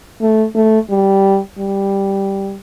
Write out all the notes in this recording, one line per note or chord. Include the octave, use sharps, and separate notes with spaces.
A3
A3
G3
G3